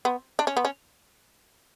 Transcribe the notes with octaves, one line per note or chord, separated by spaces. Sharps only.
B3
D4
C#4
B3
C#4